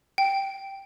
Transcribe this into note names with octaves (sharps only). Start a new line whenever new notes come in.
G5